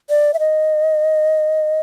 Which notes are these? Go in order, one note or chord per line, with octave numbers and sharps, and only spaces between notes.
D5
E5
D#5